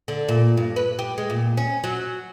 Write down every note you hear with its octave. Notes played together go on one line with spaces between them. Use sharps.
D3
A#2
G2
B4
G4
G#3
A#2
C#4
F#3